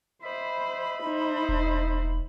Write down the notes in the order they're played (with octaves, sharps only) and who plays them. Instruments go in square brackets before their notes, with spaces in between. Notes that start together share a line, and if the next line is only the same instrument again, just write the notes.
[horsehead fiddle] C5 [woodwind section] D#5 E5 B5
[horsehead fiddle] D#4 C5
[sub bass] E1